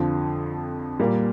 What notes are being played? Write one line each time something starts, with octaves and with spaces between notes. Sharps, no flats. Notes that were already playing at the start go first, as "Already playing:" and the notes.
Already playing: F2 D3 F3
A#2 G3 A#3